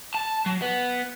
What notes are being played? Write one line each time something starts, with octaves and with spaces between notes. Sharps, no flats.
A5
F#3
B3